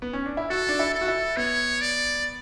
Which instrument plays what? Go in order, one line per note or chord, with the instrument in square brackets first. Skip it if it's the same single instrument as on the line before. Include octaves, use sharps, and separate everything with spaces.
[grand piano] B3
C#4
D4
E4
[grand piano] F#4 [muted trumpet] A4
[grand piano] D4
E4
[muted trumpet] A4
[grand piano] F#4
E4
[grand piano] B3 [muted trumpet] C#5
[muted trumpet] D5